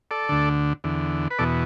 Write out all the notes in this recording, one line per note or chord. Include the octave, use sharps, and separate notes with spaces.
A4 D5
D2 D3
E2 D3
B4
E2 B2 A4 D5